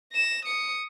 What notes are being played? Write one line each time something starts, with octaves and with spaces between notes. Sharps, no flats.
A#6 E7
D#6 C#7